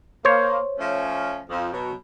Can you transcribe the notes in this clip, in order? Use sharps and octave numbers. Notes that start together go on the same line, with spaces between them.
A#3 C5 C#5
F3 A3 C#4
F2 F3
B2 F#3